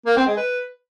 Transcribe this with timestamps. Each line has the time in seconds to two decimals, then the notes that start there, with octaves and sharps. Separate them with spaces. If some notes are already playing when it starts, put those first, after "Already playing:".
0.06 A#3
0.17 C4
0.27 G#3
0.37 B4